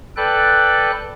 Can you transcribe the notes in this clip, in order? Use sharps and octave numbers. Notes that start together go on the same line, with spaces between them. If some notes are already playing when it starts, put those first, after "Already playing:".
A4 B4 D5 G5 F#6